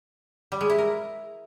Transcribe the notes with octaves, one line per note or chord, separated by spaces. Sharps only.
G3
G#3
E4
A#4